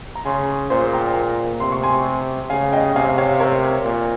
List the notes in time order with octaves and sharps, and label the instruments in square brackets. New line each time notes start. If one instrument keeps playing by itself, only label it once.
[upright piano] A#5
[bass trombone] C#3 [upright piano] G#5 C6
[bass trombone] A#2 [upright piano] G#4 C5
[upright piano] G5 A#5
[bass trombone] C3 [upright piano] C6
[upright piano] C#6
G#5 C6
[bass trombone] C#3 [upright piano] F5 G#5
[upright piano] D#5 G5
[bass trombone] C3 [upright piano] F5 G#5
[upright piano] C#5 F5
A#4 C#5
[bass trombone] A#2